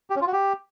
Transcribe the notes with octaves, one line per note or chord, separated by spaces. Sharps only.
G4
C#4
F4
F#4
G4